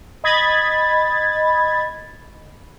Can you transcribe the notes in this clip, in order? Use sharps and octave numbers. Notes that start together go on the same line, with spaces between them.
D#5 B5 G#6 A6